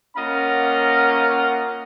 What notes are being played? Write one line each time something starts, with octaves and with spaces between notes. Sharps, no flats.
A#3 C#4 F4 D#5 F#5 A#5